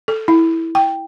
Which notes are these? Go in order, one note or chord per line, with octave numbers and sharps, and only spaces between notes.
A4
E4
G5